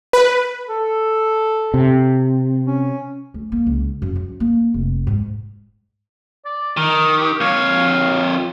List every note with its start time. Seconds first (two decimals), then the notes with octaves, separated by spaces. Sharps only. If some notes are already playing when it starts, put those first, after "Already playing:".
0.13 B4
0.68 A4
1.74 C3
2.67 C#4
3.34 D2
3.52 A#3
3.67 C#2
4.02 F#2
4.16 F#2
4.40 A#3
4.74 F1
5.07 G#2
6.45 D5
6.77 D#3 A#4
7.17 G4
7.40 F2 C#5 F5